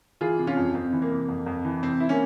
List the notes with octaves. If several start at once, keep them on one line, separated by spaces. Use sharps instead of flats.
E3 F4 G#4
C3
C#4 F4
F2
F2 C4
E3
A#3
C3
F2
F2
E3
C3 C4
E4
A#3 C#4